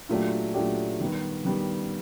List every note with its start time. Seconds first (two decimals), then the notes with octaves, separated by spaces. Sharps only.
0.09 A#2 F#3 A3 D4 G4
0.54 A#2 F#3 A3 D4 G4
1.01 D#3 G3 B3
1.45 D#3 G3 B3